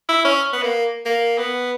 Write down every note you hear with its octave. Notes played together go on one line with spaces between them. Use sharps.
E4
C#4
B3
A#3
A#3
B3